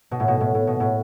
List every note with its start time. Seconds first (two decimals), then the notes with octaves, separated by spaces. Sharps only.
0.11 B2
0.20 A2
0.28 B2
0.41 A2
0.55 A2
0.67 B2
0.80 A2